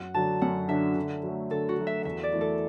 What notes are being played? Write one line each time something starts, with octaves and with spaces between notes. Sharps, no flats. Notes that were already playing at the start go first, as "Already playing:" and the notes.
Already playing: F#2 F#5
D3 F#3 D4 A5
F#2 F#5
D3 F#3 D4 E5
D3
F#3 A3
D3 A4
F#4
F#3 A3
E5
E2 E5
D5
E3 A3 E4
A4